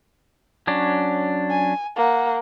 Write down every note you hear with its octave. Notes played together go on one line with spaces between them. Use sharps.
F#3 C#4 D4
G#5
A#3 F#5